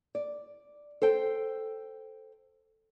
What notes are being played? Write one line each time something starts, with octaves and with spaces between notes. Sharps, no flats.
D5
A4 C5 G5